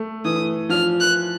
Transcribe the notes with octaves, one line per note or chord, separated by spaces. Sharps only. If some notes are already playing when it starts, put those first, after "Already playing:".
Already playing: A3
E3 D#6
F3 F6
F#6